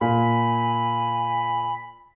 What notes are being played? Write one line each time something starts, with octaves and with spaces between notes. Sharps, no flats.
A#2 G#5 B5